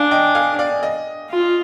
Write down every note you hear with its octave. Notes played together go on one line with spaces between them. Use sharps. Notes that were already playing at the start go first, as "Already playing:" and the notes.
Already playing: D4 F5 G#5
D#5 G5
F5 G#5
D5 F5
D#5
F4